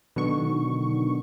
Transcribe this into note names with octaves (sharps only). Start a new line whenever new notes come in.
B2 D3 D#3 F#3 C#6